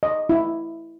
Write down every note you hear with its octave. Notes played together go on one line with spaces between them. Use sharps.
D#5
E4